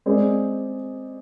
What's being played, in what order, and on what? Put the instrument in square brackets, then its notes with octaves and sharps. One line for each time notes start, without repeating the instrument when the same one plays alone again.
[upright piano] G#3 C4 G#4 D5